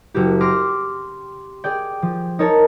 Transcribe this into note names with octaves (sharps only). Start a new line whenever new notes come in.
F#1 F#4 G4
C6 D6 F6 A#6 D7
G#4 D5 G5
F3
D#4 A#4 C#5 A5